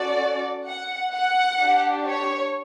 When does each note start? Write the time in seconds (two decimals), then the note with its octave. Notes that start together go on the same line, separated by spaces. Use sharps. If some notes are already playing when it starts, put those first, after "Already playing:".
Already playing: C#4 F#4 A4 D5
0.67 F#5
1.14 F#5
1.61 D4 G4
2.07 C#5